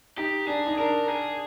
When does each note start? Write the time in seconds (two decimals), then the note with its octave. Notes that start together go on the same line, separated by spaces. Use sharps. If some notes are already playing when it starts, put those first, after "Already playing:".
0.18 D#4 G4
0.47 D4 G#4
0.67 D#4
0.78 D4 A#4
1.09 G#4